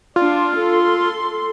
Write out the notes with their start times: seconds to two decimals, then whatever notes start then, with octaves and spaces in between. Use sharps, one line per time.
0.16 D4 F4
0.56 A4 C6